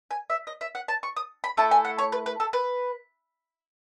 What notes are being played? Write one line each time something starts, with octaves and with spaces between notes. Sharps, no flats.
G#5
E5
D#5
E5
F#5
A5
C#6
D#6
B5
A3 E4 A4 A5
G#5
F#5
C#5
B4
B4
A4
B4